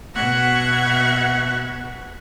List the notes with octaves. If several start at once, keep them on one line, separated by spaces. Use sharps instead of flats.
B2 F#4 E5 F#6 G#6 A#6